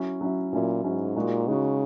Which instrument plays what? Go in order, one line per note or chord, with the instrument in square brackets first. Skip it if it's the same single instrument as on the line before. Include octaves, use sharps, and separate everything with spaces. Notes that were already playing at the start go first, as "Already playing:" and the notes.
Already playing: [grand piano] F#3 C#4 E4
F#3 C#4 E4
[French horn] A#2 [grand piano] F#3 C#4 E4
[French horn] G#2 [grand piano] F#3 C#4 E4
[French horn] A#2 [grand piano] G#3 D#4 F#4
[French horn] C#3 [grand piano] G#3 D#4 F#4